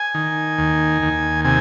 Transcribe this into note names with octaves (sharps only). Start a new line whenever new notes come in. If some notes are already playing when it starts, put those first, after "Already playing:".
Already playing: G#5
D#3
D#2
D#2
C3 G#5